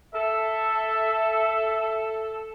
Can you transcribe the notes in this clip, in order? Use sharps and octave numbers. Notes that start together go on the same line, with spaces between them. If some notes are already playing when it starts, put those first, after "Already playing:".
A4 E5